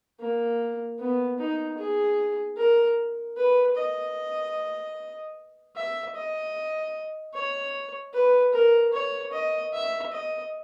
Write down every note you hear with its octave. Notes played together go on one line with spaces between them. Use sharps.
A#3
B3
D#4
G#4
A#4
B4
D#5
E5
D#5
C#5
B4
A#4
C#5
D#5
E5
D#5